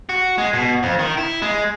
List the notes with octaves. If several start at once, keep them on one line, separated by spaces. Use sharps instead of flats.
F#4
G#3
B2
F2
D#3
E4
G#3